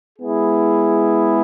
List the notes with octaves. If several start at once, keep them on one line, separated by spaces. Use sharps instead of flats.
G#3 B3 E4 G#4